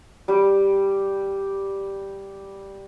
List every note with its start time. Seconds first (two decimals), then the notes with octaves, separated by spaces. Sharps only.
0.28 G3 G4